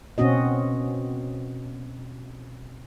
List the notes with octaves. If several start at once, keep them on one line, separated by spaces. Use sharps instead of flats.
B2 C4 C#4 F#4 D#5